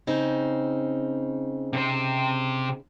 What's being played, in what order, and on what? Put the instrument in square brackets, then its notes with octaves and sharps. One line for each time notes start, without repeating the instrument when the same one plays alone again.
[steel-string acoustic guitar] C#3 C4 D#4
[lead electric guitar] C3 C5